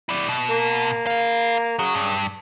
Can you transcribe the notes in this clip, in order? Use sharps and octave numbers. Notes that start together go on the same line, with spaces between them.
E4 D5
B2
A#3
G#4 F5
C#3 F#3
G2